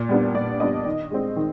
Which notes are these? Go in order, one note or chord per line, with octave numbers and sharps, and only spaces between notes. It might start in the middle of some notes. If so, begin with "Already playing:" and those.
Already playing: A#2
G3 B3 D4
A#2 D5
G3 B3 D4 D#5
D#3
G#3 C4
D#3